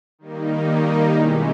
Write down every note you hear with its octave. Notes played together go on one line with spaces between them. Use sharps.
D#3 G3 A#3 D#4
B2 G#3 C#4 E4 G4